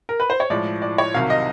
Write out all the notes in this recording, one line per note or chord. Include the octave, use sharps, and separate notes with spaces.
A#4
B4
C5
C#5
A2 F3 G#3 D5
D5
C#5
C2 C3 D#3 F#3 F5
D#5